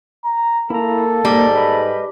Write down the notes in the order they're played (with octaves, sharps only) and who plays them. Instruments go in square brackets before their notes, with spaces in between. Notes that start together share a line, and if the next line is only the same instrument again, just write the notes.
[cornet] A#5
[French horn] A#3 [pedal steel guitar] E4 A#5 [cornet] A4
[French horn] G#2 [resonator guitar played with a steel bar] G3 [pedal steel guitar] A#3 A#4
[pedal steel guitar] B4 D#5 B5